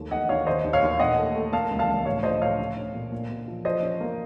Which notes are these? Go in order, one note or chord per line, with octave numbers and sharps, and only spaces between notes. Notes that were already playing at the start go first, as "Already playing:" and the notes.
Already playing: D#2 A3
D#2 D#5 F#5
D#2 C#5 F5
D#3 C5 D#5
D#2
C#5 F5
D#2
A#2 D#5 F#5
A3
A3
A#3 F5 A5
C#2
F5 A5
C#2
A2 C#5 F5
F3 C5 D#5
A2 C#5 F5
C#4
C#4
A#2
A#2
A#2
F3
F3 C5 D#5
C#4
A#3